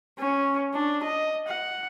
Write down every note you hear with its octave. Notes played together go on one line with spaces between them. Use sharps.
C#4
D4
D#5
F#5